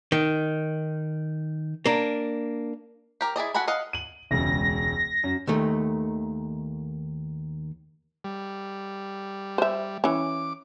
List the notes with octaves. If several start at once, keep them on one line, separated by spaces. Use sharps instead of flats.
D#3
A#3 D4
G4 A#4
E4 G#4 D5 D#5
F#4 A4 F#5 G#5 B5
D#5 F5 F#5
D#7 F#7
E1 C#2 A#6
F#2
D#2 D#3 A3
G3
C5 E5
E3 C#4 D6